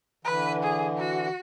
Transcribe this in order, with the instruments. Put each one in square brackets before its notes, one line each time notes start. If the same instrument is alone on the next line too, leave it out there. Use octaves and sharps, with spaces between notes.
[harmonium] D3 E3 [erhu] B4
[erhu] G#4
F#4